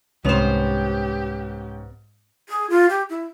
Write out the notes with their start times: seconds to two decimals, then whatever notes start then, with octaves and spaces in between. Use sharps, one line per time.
0.24 C2 G#2 B3 C#4 G4 C5 F7
2.49 G#4
2.70 F4
2.89 G4
3.10 E4